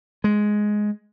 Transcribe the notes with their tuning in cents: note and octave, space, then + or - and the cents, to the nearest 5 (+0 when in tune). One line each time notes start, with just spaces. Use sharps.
G#3 +5